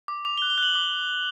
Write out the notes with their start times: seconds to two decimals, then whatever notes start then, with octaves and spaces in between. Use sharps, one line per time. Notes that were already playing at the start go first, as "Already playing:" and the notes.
0.08 D6
0.25 D6 F7
0.38 G7
0.42 F#6
0.50 G7
0.58 F#6 F#7
0.74 D6 G7